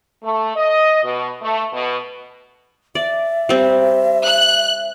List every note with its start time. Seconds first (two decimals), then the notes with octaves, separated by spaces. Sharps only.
0.22 A3
0.55 D#5
1.03 B2
1.41 A3
1.71 B2
2.95 D5 E5
3.49 G3 C4
4.25 F#6